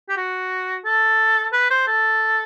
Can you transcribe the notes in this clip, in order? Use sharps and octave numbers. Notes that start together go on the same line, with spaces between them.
G4
F#4
A4
B4
C5
A4